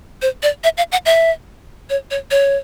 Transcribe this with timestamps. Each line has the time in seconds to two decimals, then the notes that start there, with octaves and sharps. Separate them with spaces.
0.22 C5
0.43 D5
0.64 E5
0.77 F5
0.92 F#5
1.06 E5
1.90 C#5
2.11 C#5
2.31 C#5